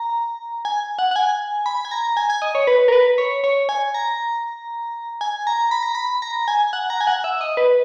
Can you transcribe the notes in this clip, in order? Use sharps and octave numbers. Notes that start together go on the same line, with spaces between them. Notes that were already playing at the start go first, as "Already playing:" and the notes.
Already playing: A#5
G#5
F#5
F#5
G#5
B5
G#5
A#5
G#5
G#5
D#5
C#5
B4
A#4
B4
C#5
C#5
G#5
A#5
G#5
A#5
B5
A#5
B5
A#5
G#5
F#5
A#5
G#5
F#5
E5
D#5
B4